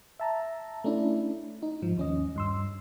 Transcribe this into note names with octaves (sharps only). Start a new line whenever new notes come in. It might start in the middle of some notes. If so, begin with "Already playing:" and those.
E5 A5 A#5
A3 C#4 D4 E4
D#4
G#2 F3
D#2 C#4 D#5
G2 C6 E6